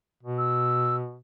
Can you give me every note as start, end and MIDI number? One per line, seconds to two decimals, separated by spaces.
0.23 1.17 47
0.38 0.96 88